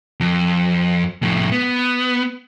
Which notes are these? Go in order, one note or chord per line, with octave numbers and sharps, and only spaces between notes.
F2
F2 A2
B3